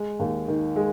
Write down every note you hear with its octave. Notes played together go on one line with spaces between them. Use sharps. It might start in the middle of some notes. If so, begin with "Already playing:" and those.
Already playing: G#3
D#2
D#3
G#3